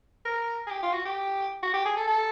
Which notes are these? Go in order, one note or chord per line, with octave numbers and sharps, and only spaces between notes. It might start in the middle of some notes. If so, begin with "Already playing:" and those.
A#4
G#4
G4
F4
F#4
G4
F#4
G4
G#4
A4
A4